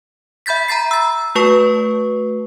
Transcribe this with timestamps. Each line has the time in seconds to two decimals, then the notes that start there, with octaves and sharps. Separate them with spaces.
0.46 E5 B5 G6 A6 B6
0.68 A#5 B5 A6 C7
0.91 E6 A6
1.35 A3 F#4 B4 A5 C#6